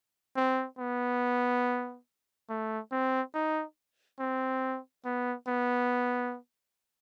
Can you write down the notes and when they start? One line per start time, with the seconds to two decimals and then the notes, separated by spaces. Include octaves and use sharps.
0.36 C4
0.79 B3
2.49 A3
2.92 C4
3.34 D#4
4.19 C4
5.05 B3
5.48 B3